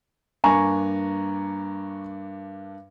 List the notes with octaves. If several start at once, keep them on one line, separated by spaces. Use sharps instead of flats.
G2 A#3 D4 G#5 A#5 C#6